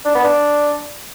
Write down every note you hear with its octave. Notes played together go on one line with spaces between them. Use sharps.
D4
B3
D4